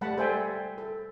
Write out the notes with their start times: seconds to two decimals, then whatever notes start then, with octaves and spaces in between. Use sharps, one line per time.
0.01 G3 A3 F#5 A5 B5
0.17 A4 C5 E5 G5 G#5
0.78 A4